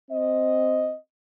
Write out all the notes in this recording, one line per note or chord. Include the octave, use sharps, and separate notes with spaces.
C4 D#5